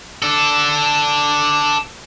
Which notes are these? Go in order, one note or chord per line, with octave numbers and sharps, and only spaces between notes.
D4 A4